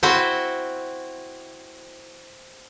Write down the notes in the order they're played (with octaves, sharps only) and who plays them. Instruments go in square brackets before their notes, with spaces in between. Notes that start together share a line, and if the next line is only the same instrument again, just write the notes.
[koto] C4 E4 F#4 C5